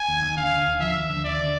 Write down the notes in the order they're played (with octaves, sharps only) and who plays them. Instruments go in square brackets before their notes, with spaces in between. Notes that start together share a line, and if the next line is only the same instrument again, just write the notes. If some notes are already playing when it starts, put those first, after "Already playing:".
Already playing: [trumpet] G#5
[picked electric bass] D#2
D#2
[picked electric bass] D3 [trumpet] F5
[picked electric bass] D3
D#2
[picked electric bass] F3 [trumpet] E5
[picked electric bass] D#2
D3
[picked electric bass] D#2 [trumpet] D5
[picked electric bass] D3